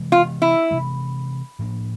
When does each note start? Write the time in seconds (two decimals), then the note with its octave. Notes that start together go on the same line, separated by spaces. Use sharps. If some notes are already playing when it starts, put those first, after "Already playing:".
Already playing: C3 E3 G#3
0.12 F4
0.42 E4
0.71 C3 E3 G#3
1.59 A2 F3 A#3 D4